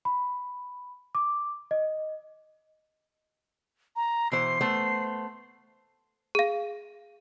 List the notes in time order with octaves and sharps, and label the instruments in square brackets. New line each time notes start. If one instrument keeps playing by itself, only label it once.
[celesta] B5
D6
D#5
[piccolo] A#5
[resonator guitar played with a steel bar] B2 E3 C5 [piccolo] C7
[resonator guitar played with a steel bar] A3 B3 C5
[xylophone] G#4 F5